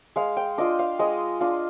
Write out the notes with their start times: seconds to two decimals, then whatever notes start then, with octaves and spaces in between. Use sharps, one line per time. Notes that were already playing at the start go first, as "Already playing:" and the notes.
0.16 G#3 F5
0.37 G5
0.58 D4 F4 D#5
0.79 F5
0.99 G#3 D#5
1.41 D4 F4